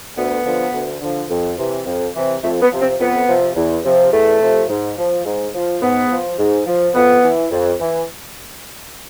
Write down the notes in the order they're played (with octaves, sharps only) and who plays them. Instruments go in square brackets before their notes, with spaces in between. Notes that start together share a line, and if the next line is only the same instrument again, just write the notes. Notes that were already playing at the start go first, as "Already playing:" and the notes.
[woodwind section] D2 B3
D3 F3
D2
D3 F3
F2
C3 E3
F2
C3 E3
F2 A3
B3
C3 F3
C4
F2 B3
C3 F3
E2
C3 F3
E2 A3
C3 F3
G#2
F3
G#2
F3
G#2 B3
F3
G#2
F3
F2 B3
E3
F2
E3